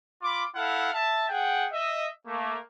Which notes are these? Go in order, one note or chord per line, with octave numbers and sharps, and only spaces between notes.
F4 B5 D6
E4 A4 F5 F#5
E5 A5
G#4 F#5 G5
D#5 E5
A3 A#3